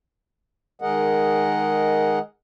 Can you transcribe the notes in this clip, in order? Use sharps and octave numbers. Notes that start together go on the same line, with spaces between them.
D#3 G#3 G#4 A#4 D#5 F#5